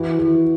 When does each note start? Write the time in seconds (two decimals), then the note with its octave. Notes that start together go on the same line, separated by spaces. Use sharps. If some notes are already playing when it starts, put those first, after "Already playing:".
Already playing: E3 E4 F#4
0.19 E3